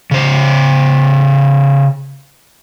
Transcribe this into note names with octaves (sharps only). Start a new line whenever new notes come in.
C#3 C5